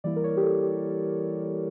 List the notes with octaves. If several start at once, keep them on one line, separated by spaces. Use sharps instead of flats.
E3 G3 A#3 E4 D5
A#4
C#5
G4
A4
G4